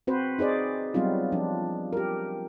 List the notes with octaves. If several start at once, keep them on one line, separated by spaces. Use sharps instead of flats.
C4 F#4 B4 C5
D#4 G#4 C5 D5
F#3 G3 B3 C4 D#4 F4
F3 D4
G4 A#4